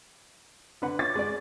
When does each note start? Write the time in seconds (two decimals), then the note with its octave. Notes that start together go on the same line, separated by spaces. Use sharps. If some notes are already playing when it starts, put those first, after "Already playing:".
0.82 D3 B4 F#5
0.99 C#5 C#6 D6 A6
1.16 G#3 D5